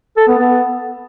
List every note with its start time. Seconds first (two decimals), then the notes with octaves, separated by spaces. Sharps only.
0.17 A4
0.28 B3
0.38 B3